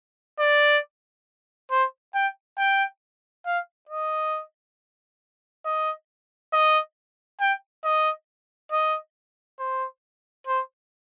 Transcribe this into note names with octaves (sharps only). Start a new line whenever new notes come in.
D5
C5
G5
G5
F5
D#5
D#5
D#5
G5
D#5
D#5
C5
C5